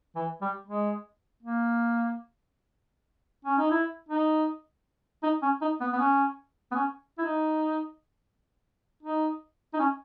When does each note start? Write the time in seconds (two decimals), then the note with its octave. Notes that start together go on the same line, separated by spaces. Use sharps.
0.16 E3
0.42 G3
0.67 G#3
1.43 A#3
3.45 C#4
3.58 D#4
3.71 E4
4.09 D#4
5.23 D#4
5.43 C#4
5.61 D#4
5.81 B3
5.93 B3
5.99 C#4
6.71 B3
6.75 C#4
7.18 E4
7.25 D#4
9.03 D#4
9.74 D#4
9.79 C#4